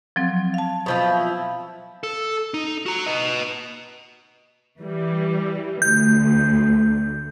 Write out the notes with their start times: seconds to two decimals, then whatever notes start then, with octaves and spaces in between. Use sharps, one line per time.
0.16 F3 F#3 C4
0.54 F5 A5
0.86 B2 F3 E4
2.03 A4
2.54 D#4
2.86 F#4 A#5
3.06 B4 D#5
4.79 E3 G3
5.82 D2 G6